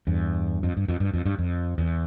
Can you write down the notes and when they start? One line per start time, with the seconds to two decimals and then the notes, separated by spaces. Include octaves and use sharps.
0.07 E2 G2
0.63 F2
0.77 G2
0.88 F2
1.00 G2
1.14 F2
1.25 G2
1.39 F2
1.78 E2